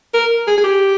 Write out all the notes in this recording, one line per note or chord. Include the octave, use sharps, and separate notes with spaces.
A#4
G#4
G#4
G4